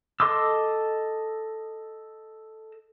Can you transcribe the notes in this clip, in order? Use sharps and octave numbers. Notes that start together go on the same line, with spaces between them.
A4 D#5 C6 D6 E6